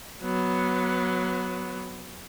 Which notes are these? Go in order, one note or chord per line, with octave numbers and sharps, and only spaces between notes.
F#3 B3